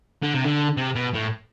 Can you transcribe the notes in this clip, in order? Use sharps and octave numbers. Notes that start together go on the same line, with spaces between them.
D3
C3
D3
C3
B2
A2